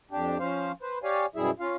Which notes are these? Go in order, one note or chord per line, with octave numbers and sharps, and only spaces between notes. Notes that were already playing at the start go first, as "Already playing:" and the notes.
F2 D4 G4
F3 C#4 C5 F5
B4 C5
G4 C#5 D5 F5 G#5
F#2 B2 G3 E4 G#4 E5
C#4 F4 F5